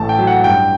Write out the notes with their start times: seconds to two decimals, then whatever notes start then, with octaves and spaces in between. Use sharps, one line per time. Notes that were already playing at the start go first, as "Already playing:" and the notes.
Already playing: A1 A3 A5
0.09 G5
0.19 F#3
0.27 F#5
0.44 G2 G5